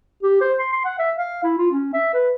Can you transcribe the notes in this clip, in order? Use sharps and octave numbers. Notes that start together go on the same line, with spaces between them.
G4
C5
C6
C6
F#5
E5
F5
E4
F4
C#4
E5
B4